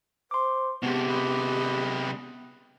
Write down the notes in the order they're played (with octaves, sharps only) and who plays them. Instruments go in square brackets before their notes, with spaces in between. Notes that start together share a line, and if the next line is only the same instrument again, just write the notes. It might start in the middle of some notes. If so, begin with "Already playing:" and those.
[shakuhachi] C5 [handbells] C6 D6
[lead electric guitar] C3 G#3 [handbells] B3 [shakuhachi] G4 [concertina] A5
[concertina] B4 D#5